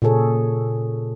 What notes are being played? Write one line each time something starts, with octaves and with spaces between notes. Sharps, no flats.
A#2 C#3 G#4 A4 C#5